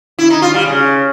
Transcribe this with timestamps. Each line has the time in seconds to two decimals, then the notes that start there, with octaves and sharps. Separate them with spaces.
0.19 E4
0.30 D#4
0.42 F4
0.54 G3
0.66 C#3